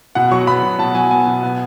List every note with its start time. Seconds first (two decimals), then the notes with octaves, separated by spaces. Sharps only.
0.15 B2 F#5
0.32 F#3 C#6
0.47 B3 B5
0.63 B2
0.78 B2 A5
0.95 F#3 G#5
1.10 B3 G#5
1.27 B2
1.43 B3